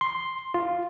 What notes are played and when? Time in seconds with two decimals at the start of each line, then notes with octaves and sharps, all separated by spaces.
0.01 C6
0.54 F4